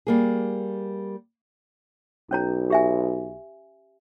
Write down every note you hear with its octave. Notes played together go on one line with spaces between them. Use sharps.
G3 A#3 G#4
B1 C#4 C#5 A#5
G4 E5 G#5